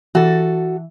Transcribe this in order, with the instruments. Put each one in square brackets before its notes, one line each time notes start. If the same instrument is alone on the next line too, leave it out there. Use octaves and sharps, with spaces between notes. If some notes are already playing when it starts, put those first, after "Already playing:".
[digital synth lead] E3 [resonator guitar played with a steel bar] F#4 A4